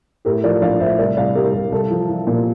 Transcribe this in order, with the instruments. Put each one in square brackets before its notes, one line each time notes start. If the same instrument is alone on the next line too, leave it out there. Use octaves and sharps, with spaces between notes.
[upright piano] A2 G4 A#4
F3 A#4 D5
A#1 D5 F5
A2 C5 E5
C2 A#4 D5
C2 D5 F5
C2 G4 A#4
C2 G4 A#4
C2 A4
F3
F3
A#2